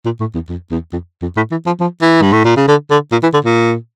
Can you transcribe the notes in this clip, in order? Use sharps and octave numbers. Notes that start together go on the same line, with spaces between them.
A#2
A2
E2
F2
E2
F2
F2
A2
E3
F3
F3
E3
G2
A2
A#2
C#3
D3
D3
A#2
E3
D3
A#2